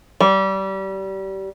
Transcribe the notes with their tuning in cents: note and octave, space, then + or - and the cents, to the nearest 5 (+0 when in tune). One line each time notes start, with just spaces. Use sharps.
G3 -25